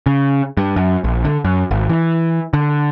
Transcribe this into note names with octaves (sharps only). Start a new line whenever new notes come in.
C#3
G2
F#2
A#1
D3
F#2
G#1
E3
D3